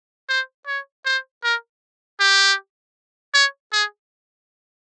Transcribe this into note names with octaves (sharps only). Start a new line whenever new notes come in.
C5
C#5
C5
A#4
G4
C#5
G#4